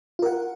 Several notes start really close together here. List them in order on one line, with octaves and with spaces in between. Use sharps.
F4 A#4 F#5